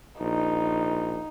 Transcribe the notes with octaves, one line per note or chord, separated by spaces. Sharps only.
A#1 D#4